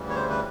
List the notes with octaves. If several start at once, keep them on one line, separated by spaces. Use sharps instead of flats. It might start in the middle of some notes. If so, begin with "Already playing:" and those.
Already playing: D2 C#3 E3 G3
C#5
C5
B4